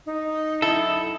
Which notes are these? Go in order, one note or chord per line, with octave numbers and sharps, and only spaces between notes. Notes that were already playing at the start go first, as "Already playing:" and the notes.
D#4
F#2 E4 A4